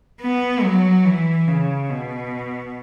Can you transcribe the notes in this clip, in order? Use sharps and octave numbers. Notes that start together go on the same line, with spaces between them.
B3
F#3
E3
C#3
B2